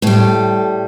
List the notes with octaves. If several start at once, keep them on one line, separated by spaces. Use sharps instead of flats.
A2 G3 A4